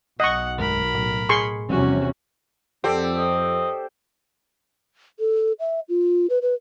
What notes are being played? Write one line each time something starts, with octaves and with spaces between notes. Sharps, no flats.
B1 D#5 F#5 C#6
D2 G2 G#3 A#4 B5
A2
G#4 C6 C#6
E2 C3 F3 G3 C4 C#4 F#4
F2 C4 G4 A4 D5
D#5
A4
E5
F4
B4
B4